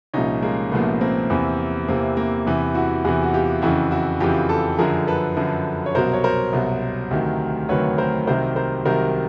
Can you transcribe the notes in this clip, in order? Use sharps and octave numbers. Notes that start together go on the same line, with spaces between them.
C2 A#2 F3 C#4 D#4
G#3 A#3
C2 A#2 F3 A3 B3
A#3 C4
E2 C3 E3
E2 C3 E3 A#3 C4
A#3 C4
E2 C3 E3
E4 F#4
E2 C3 E3 F#4 G#4
F#4
F4 G4
F2 C#3 E3 E4 F#4
E4 F#4
F2 C#3 E3 F4 G4
G4 A4
F#2 D3 F3 G#4 A#4
A4 B4
F#2 D3 F3
C#5
C2 B2 F#3 A#4 C5
C#5
A#4 C5
C2 B2 F#3
D2 C3 D#3 F#3
D2 C3 D#3 F#3 B4 C#5
A#4 C5
C2 C3 D#3 F#3 A#4 C5
A#4 C5
C2 C3 D#3 F#3 A#4 C5